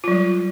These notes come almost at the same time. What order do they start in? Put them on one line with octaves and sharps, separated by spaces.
F4 F#3 G3